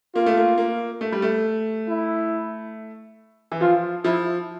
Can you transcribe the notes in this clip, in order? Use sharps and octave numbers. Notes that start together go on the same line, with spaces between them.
A#3 F4
A3
A#3
A#3
A3
G3
A3
E4
E3
F3 F4
F3 E4